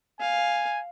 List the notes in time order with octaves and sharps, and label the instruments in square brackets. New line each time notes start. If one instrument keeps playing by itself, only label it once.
[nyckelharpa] F5 [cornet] G#5